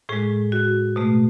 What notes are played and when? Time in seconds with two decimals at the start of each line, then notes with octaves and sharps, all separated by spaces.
0.09 A2 G#3 G#4
0.52 F#4
0.96 B2 A3